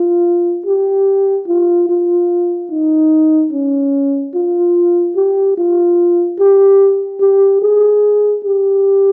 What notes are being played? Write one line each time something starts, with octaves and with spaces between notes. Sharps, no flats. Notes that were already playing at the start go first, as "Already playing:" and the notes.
Already playing: F4
G4
F4
F4
D#4
C#4
F4
G4
F4
G4
G4
G#4
G4